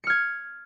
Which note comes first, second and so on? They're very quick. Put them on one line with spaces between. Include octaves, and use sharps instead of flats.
C#7 F6 G#6